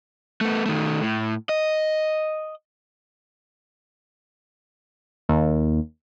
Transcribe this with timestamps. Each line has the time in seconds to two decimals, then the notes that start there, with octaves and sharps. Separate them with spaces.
0.41 A3 B3
0.66 D#3 A3
1.03 A2
1.49 D#5
5.29 D#2